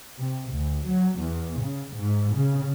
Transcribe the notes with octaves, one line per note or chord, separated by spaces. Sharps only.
C3
D2
F#3
E2
C#3
G#2
C#3